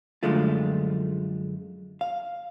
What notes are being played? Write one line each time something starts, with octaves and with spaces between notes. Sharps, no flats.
F#2 D3 F3 G#3 A3 F4
F5